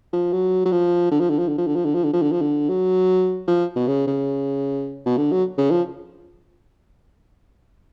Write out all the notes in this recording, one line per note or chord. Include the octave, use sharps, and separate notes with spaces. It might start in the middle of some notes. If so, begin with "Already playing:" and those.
F3
F#3
F#3
F3
D3
F3
D3
F3
D3
F3
D3
F3
D3
F3
D3
F3
D3
F3
D3
F#3
F3
B2
C#3
C#3
B2
D3
F#3
C#3
F3